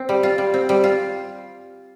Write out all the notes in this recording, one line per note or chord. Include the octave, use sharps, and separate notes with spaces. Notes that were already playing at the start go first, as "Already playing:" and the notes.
Already playing: C4
G3
F4
G3
C4
G3
F4